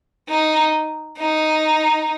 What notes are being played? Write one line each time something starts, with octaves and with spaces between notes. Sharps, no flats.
D#4
D#4